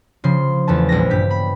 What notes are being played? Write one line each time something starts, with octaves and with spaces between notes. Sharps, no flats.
C#3 F3 C6
E2 A3 C#4 A5
A#1 G3 G#3 A#6
G2 G4 B6
B5